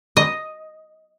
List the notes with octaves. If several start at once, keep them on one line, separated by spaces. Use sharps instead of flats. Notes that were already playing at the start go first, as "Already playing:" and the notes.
D#5